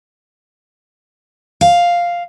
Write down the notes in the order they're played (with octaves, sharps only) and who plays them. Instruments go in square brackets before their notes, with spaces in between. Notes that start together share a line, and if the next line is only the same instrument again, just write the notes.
[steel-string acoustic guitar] F5